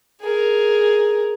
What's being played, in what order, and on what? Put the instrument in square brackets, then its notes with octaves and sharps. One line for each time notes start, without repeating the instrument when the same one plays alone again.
[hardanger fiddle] G#4 A#4